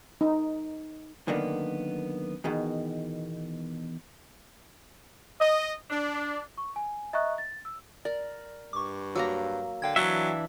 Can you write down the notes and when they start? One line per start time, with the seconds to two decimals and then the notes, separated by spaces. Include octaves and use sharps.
0.21 D#4
1.27 F#2 D3 D#3 A#3 B3
2.44 E2 B2 D#3
5.40 D#5
5.90 D4
6.58 C#6
6.76 G#5
7.13 D#5 E5 A#5 C#6 D#6 F#6
7.38 A6
7.65 E6
8.05 A#4 D5
8.73 G2 C#6 D6
9.15 F#3 A#3 A#5 E6
9.82 D3 F5 G5 G#6
9.96 E3 F#3 D4 E5 A#5